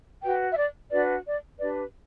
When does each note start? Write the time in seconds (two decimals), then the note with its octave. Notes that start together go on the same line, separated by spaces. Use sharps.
0.22 F#4 B4 G5
0.52 E5
0.56 D5
0.90 D4 F#4 B4 D5
1.25 D5
1.58 D4 G4 B4 D5